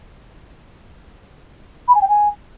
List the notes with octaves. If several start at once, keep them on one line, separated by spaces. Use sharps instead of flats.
B5
G#5
G5
G#5